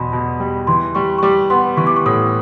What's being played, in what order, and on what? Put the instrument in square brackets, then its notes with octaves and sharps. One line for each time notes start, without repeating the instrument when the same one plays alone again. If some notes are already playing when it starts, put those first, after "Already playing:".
Already playing: [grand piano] E2 B2 [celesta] B5 C6
[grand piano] B2
G3
[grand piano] E3 [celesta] C6
[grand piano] G3 [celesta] C#6
[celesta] C#6
[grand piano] G3 [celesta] D6
[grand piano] B3 [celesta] C6
[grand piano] E3 [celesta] C#6
[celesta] D6
C#6
[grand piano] A2 [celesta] D#6